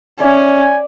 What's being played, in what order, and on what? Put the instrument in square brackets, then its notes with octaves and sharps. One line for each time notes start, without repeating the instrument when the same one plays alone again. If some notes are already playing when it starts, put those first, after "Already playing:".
[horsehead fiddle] C#4 [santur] D5 E5 [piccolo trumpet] G#5